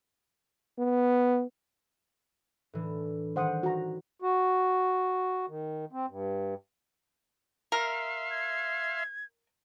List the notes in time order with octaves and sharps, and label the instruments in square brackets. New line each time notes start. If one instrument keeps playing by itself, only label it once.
[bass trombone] B3
[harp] A2 E3 D4
[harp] D#3 G3 [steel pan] C5 F#5 D#6
[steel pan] F#4 A#5
[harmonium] F#4
D#3
C4
G2
[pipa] A#4 [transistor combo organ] E5 F5 C6
[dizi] G#6